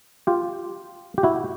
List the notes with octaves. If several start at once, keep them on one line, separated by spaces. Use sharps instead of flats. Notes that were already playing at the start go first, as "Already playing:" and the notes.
F4 G4
G4
E4 F#4